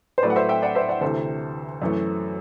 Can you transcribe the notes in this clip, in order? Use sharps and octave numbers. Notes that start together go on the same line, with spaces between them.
C5
A2 F#3 A3 B4 D5
F#5
C5 E5
E5 G5
D5 F#5
C5 E5
D5 F#5
D2 C3 E3 A4 C5
F#2 E3 A3